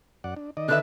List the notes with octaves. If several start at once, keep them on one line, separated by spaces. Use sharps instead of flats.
F#2 D5 F#5
D4
D#3 D5 D#5
D3 B4 E5 F#6